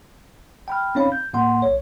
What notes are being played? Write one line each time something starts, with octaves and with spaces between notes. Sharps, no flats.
G5 B5 F6
C4 C#4 D#4 C#5 F5 B5
G6
A2 A#3 F#5 C6
B1 C#5